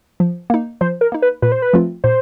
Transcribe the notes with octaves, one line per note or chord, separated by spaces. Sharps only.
F3
A#3 D#4
F3 C5
A#4
A#3 D#4
B4
A#2 B4
C5
B4
F3 A3 C4 F4
A#2 C5